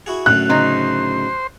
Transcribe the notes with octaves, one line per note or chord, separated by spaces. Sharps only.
E4 F#4 G#4
F#2 A2 D3 F#6
C#3 D#4 C5